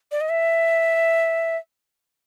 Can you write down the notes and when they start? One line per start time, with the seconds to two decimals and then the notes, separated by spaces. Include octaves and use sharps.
0.11 D5
0.21 D#5
0.29 E5